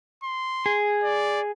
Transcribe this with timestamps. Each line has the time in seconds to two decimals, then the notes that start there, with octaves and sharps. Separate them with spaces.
0.23 C6
0.66 G#4
1.04 D5